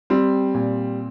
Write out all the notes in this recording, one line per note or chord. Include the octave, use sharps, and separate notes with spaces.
G3 C4
A#2